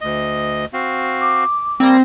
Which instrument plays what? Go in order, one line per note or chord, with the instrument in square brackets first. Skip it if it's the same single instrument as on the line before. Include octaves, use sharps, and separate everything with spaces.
[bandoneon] D2 D#5
C4 F#4 F5
[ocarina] D6
[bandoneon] G3 A#3 [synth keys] C4 A#6